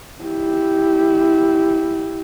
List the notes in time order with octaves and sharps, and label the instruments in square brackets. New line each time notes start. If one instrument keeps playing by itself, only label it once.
[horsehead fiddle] E4 G4